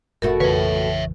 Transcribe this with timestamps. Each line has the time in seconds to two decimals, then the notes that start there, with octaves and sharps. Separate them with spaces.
0.22 F1 B2 A3 F#4 A#4
0.40 A1 F2 C#3 E3 B4 C#5 E5